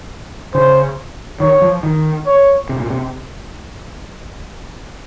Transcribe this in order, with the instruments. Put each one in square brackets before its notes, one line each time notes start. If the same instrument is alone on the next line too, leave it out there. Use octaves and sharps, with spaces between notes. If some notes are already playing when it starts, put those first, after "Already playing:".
[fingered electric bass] C#3 [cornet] C5
[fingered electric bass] D#3 [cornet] C#5
[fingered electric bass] F3
D#3
[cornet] C#5
[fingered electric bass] C3
A#2
C3